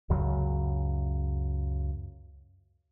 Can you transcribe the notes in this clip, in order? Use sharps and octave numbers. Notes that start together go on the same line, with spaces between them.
C#2 F#2 C#3 F#3